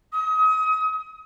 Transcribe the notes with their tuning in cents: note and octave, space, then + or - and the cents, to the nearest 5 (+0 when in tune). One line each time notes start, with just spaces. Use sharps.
D#6 +35